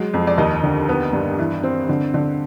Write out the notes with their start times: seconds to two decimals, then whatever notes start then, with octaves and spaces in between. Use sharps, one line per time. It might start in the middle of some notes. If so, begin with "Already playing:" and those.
Already playing: F#3 G#3
0.14 F2
0.27 D5
0.38 D#2 D#5
0.63 D3
0.89 B3
1.13 G2
1.39 E3
1.63 C4
1.89 D3
2.14 D3